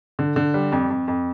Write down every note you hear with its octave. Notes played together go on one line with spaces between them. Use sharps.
D3
D3
G3
F2
F2
F2